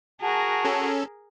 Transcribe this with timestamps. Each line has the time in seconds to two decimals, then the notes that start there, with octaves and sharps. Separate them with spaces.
0.21 F#4 G#4 A#4 A5
0.65 C#4 A4